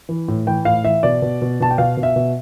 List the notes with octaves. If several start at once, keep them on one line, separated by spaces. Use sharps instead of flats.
E3
A2
E3 G5
A2 F5
E3 E5
B2 D5
B2
B2
B2 A5
G5
B2 F5
B2
E5
B2